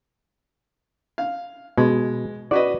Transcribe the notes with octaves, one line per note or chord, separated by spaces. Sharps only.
F5
B2 G#3
F#4 B4 D5 D#5